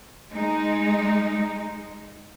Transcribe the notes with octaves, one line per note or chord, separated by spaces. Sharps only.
G#3 D#4